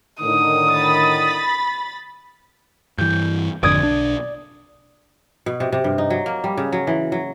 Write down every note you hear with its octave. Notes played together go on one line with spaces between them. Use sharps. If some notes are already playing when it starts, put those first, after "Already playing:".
A2 D3 D#3 D#6
B5 A6
G2 E3 G6
G#1 F2 D3 D5 D#6 G#6
B1 D4
B2
C3
C3
G2
D#4
F#3
A#3
G3
C#3
F#3
E3
F#3